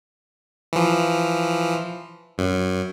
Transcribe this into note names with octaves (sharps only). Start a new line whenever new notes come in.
E3 F3
F#2